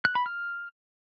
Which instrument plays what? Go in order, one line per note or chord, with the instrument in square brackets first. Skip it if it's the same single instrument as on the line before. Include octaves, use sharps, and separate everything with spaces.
[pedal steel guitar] F#6
B5
F6